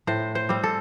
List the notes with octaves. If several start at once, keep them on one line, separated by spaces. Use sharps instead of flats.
A2 C5
C5
G3 C4
A4